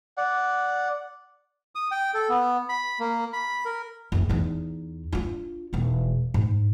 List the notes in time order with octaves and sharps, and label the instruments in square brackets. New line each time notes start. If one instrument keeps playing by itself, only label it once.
[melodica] D5 F#5
[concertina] D#6
G5
A4
B3
B5
A#3
B5
A#4
[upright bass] F#1 D#4
E2 D#4
D4 F4
E1 D#4
G#2